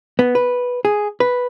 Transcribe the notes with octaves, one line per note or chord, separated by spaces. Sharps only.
B3
B4
G#4
B4